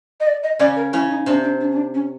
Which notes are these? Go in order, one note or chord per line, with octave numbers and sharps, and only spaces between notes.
D#5
D5
D#5
C#3 C#4 D5
A#4
C#3 C#4 E4
D#4
C3 C4 D4
D4
D4
C#4
D4
C#4